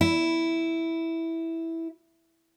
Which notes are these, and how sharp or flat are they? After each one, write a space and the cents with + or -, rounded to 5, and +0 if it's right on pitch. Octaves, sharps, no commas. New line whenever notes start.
E4 -5